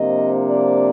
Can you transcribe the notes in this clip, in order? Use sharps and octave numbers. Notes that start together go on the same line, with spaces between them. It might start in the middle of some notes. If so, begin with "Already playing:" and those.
Already playing: C3 F3 A#3 D4 D#5
D5